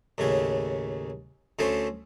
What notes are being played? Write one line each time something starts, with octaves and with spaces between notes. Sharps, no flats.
D#2 A2 C#3 C#4
D2 A3 C#4 A4 C5